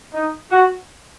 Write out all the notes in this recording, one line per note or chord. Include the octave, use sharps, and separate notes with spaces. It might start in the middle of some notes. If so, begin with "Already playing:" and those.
D#4
F#4